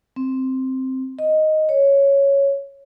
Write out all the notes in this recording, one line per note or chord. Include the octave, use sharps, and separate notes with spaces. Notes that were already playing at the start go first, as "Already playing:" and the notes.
C4
D#5
C#5